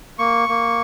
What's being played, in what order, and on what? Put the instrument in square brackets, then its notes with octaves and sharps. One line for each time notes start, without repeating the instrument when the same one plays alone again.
[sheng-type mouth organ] A#3 C#6
A#3